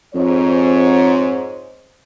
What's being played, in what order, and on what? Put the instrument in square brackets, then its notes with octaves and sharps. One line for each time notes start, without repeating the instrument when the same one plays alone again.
[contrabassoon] F2 [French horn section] G#2 C#5